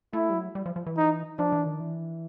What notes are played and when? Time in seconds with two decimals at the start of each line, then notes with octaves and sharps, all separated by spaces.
0.13 A3 E4
0.30 G3
0.34 F#3
0.55 G3
0.66 F3
0.76 F3
0.86 E3
0.98 D#4
1.39 F3 D4
1.52 E3
1.66 D#3
1.80 E3